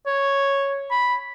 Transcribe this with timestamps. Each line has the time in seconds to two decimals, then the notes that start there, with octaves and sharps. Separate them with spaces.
0.07 C#5
0.91 B5